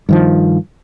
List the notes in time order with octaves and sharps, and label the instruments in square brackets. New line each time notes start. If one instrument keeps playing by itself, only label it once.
[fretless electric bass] G2 D#3 F3